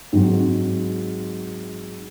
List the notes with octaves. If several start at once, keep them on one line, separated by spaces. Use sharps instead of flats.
G#2 F#3 G#3 C4